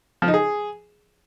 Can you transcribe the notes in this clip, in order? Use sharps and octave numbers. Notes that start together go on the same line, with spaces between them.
F3
D#4
G#4